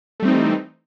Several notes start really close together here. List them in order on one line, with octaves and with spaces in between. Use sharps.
A3 G3 C4 D#4 E3